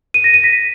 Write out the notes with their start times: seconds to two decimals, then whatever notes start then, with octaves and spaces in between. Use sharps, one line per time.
0.14 D#7
0.24 A#6
0.34 D#7
0.44 B6